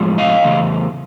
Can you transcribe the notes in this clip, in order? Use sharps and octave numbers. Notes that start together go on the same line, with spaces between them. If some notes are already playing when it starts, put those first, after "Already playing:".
Already playing: A2 F3 G#3
D#5 F5
C#3 E3 A3